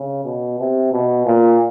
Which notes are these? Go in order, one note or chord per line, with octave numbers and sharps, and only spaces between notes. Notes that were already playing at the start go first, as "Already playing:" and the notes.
Already playing: C#3
B2
C3
B2
A#2